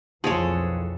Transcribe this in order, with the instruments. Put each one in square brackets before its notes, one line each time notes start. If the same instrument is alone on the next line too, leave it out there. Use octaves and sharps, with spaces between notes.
[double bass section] B1 F2 E3 [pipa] F3 G#3 [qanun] G#4 A4 C#5